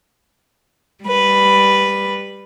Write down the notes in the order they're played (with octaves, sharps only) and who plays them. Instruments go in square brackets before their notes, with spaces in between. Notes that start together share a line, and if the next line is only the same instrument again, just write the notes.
[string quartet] G3 B4